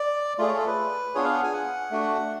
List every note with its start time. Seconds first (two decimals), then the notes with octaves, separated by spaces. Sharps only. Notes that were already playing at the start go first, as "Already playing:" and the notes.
Already playing: D5
0.38 A3 F4 G#4 D5
0.48 C#5
0.58 A4
0.67 B4
1.15 B3 D4 F4 G#4 C#5
1.24 F5
1.33 F#5
1.43 G#5
1.53 F#5
1.91 A3 D4 F#4